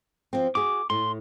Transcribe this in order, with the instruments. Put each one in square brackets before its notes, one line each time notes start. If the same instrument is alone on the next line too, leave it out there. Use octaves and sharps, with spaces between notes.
[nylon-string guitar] F3 C4
[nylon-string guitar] F#4 G#4 [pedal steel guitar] D6
[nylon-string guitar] A2 [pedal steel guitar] C6